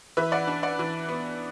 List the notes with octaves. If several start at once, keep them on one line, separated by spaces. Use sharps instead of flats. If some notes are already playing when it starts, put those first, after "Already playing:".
E3 B4 E5
D5 F#5
D4
D5 F#5
E3
B3